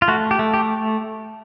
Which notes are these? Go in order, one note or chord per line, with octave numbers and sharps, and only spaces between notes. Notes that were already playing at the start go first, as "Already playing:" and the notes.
F4
A3 F#4
G4
A3
G4